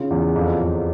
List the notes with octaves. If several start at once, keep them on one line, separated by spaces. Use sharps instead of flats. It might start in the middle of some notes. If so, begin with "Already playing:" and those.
Already playing: C#3 F4
E2
F2
F2